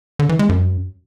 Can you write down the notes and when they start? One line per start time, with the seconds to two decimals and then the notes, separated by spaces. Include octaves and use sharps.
0.19 D3
0.29 E3
0.39 G#3
0.49 F#2